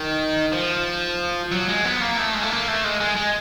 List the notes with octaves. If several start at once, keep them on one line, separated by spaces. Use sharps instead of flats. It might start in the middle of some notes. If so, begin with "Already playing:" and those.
Already playing: D#3
F3
F#3
G#3
B3
A#3
A3
G#3
A3
A#3
A3
G#3
G#3
G#3